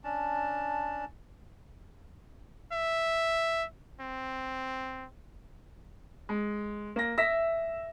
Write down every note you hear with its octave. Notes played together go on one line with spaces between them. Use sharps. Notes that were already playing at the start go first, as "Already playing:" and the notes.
C#4 D4 A5
E5
C4
G#3
A#3 A#6
E5 A#6 B6